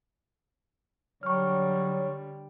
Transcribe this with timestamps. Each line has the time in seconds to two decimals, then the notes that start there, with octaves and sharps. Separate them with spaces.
1.23 D3 F#3 G3 C#5 C#6 F6